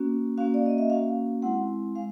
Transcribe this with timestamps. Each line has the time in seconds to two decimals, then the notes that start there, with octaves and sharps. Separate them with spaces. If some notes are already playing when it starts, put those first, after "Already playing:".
Already playing: A#3 C#4 F#4
0.38 A#3 C#4 F#4 F5
0.54 D5
0.66 D#5
0.78 E5
0.90 A#3 C#4 F#4 F5
1.42 G#3 C4 E4 F#5
1.95 G#3 F5